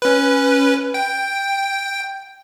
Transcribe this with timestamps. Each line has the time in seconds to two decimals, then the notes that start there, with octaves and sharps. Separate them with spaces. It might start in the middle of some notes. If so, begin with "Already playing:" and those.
0.02 C#4 B4
0.94 G5